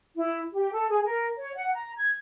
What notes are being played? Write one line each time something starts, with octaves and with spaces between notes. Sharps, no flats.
E4
G4
A4
G#4
A#4
C#5
F#5
A#5
G#6